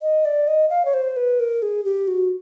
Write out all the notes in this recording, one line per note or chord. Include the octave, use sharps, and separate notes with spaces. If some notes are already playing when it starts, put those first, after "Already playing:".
D#5
D5
D#5
F5
C#5
C5
B4
A#4
G#4
G4
F#4